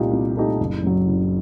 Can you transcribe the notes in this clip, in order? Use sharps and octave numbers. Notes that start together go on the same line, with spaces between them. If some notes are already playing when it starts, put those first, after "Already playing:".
Already playing: C2 A#2 A3 D#4 G4
C2
A#2 A3 D#4 G4
F#1
F#2 F#3
F#1